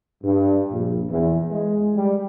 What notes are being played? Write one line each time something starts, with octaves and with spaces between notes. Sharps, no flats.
G2
A#1
E2
G#3
G3